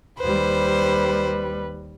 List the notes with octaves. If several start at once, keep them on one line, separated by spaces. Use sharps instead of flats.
D#2 G3 B4 C5